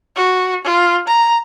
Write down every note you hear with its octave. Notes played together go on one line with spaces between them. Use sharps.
F#4
F4
A#5